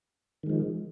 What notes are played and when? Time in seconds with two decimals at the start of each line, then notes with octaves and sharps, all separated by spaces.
0.43 D#3
0.46 G#3
0.50 F3